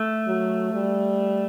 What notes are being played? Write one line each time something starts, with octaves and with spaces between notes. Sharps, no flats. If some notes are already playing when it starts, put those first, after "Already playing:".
Already playing: A3
F#3
G3